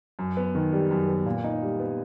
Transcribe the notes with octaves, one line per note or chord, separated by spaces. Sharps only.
F#2
B3
D#3
G3
F#2
B3
A#2
D#4
G3
B3